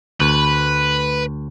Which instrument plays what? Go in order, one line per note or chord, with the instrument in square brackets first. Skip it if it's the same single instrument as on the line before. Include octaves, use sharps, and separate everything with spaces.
[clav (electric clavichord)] D2 [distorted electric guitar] B4